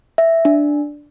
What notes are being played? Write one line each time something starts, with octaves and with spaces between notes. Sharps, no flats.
E5
D4